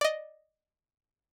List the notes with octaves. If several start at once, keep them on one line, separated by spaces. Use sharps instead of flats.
D5 D#5